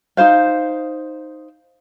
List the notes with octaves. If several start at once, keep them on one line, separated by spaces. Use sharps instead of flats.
D#4 F4 C5 F5